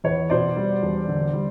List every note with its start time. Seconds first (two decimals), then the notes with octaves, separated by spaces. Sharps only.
0.04 E2 B4 C#5
0.30 B2 C5 D5
0.56 G3
0.82 E1
1.08 D3
1.33 G3